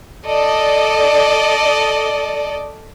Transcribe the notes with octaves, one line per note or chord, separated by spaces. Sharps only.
A4 D5 D#5